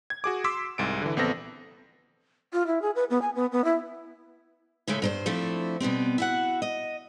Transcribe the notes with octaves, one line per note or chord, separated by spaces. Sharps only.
G#6
F#4 G#4 D6
C6 D6 E6 B6
C2 G#2 D7
D3 E3
A#1 B3 C4 A4 A#6
F4
E4
G#4
B4
B3
G#5
B3
B3
E4
A2 C#3 G#3 A3
G2 A#4 C5
F3 A3 C4 D4 E4
B2 G3 B3 C4
E4 F#4 F#5
D#5